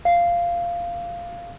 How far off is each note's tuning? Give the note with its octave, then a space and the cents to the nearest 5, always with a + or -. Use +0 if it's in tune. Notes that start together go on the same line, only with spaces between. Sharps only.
F5 -10